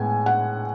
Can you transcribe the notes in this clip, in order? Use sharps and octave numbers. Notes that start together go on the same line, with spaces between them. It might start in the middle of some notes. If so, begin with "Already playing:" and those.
Already playing: A2 G#3 B3 G#5
F#5